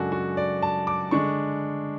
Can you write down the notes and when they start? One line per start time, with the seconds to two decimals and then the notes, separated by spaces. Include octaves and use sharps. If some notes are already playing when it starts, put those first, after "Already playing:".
Already playing: F#2 C#3 G#3 D4 F#4 A4
0.12 F#4
0.37 D5
0.62 A5
0.87 D6
1.11 D3 G#3 D4 C#6